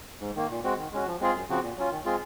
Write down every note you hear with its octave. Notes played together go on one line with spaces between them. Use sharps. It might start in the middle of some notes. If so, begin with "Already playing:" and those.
G#2
D#3 A#3
A#2
G#3 C4 F#4
D#3
G#3 C#4 F#4
F3
G#3 C4 F4 G#4
F#2
C#3 F3 C4 F#4
A#2
F#3 C#4 F4
D#3
G#3 C4 F4 G#4